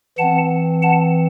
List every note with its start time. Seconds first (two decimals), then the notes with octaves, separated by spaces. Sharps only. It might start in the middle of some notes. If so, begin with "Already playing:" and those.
0.18 E3 C4 F#5 A5
0.82 F#5 A5